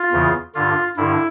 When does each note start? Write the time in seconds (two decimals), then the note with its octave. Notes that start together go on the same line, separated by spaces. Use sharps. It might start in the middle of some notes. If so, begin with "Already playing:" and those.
Already playing: F4
0.12 E2 C#3 E3
0.55 G2 D3 F4
0.97 G2 D3 E4